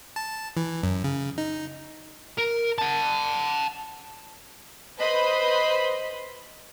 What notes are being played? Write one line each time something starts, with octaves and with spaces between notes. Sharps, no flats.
A5
E3
F#2
C#3
D#4
A#4
F#5 A5
B4 C5 D#5 B5 C6